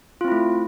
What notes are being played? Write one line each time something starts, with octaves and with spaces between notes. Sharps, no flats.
A3 C4 E4 F4